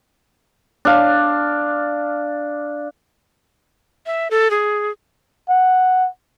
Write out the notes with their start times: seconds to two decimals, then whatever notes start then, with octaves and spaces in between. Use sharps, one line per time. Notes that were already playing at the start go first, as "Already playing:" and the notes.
0.85 D4 F5
4.06 E5
4.31 A4
4.51 G#4
5.50 F#5